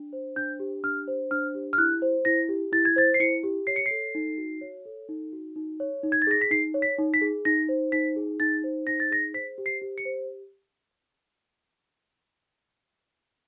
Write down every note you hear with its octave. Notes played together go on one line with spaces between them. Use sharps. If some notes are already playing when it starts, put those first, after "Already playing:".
Already playing: D4
C5
D4 G6
G4
D4 F6
C5
D4 F6
G4
F6
E4 F#6
C5
E4 A#6
G4
E4 A6
G#6
C5 A6
C7
E4 C#7
G4
C#5 C7
C#7
A4 C7
D#4
F#4
C#5
A4
D#4
F#4
D#4
C#5
D#4
G#6
A6
G#4 A#6
B6
D#4 C7
C#5
B6
D#4
B6
G#4
D#4 A#6
C5
D#4 B6
G#4
D#4 A6
C5
D#4 A#6
A6
G#4 A#6
C5 B6
G4
C7
G4
C#7
C5